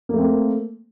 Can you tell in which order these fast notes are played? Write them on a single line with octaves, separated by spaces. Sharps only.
A#3 A3 C4 A#4